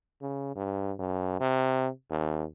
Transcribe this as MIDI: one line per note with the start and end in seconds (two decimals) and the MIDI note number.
0.22 0.53 49
0.56 0.92 43
0.99 1.37 42
1.40 1.88 48
2.10 2.44 39